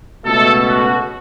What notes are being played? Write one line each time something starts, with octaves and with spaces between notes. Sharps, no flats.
C#2 B2 A3 A4
F#4